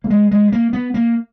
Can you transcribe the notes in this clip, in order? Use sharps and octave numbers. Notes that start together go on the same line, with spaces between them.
A#3
G#3
G#3
A#3
B3
A#3